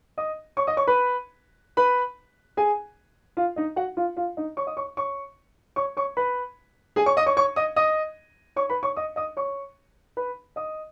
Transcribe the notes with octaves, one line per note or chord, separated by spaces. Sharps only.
D#5 D#6
C#5 C#6
D#5 D#6
C#5 C#6
B4 B5
B4 B5
G#4 G#5
F4 F5
D#4 D#5
F#4 F#5
F4 F5
F4 F5
D#4 D#5
C#5 C#6
D#5 D#6
C#5 C#6
C#5 C#6
C#5 C#6
C#5 C#6
B4 B5
G#4 G#5
C#5 C#6
D#5 D#6
C#5 C#6
C#5 C#6
D#5 D#6
D#5 D#6
C#5 C#6
B4 B5
C#5 C#6
D#5 D#6
D#5 D#6
C#5 C#6
B4 B5
D#5 D#6